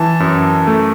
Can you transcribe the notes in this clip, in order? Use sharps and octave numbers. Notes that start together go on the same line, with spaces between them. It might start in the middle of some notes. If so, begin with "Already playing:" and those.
Already playing: E3 A5
F#2
A3